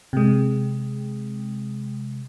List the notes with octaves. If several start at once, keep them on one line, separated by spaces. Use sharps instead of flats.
C3 G#3